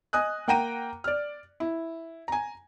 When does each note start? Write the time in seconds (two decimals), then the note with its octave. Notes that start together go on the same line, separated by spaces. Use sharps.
0.13 D#5 G#5 D#6 F#6
0.48 A#3 F#5 G5 A#5 D#7
1.04 D5 F6
1.60 E4
2.28 G#5 A#5